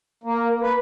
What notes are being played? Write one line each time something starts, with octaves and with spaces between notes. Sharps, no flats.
A#3
B4